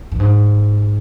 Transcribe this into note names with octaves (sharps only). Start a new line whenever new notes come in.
G2
G#2